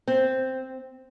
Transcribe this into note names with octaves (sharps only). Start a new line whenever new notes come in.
C4